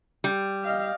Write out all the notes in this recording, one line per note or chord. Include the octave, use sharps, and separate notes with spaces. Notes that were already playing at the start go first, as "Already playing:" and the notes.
G3
D#5 F5